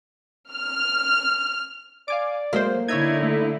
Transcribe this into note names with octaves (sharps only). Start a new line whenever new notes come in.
F6
D5 F5 G#5 D6
F#3 G#3 A#3 C5
D3 D#4 E4 C#5 E5 G#6
A3